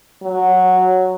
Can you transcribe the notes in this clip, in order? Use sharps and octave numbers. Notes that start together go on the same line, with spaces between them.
F#3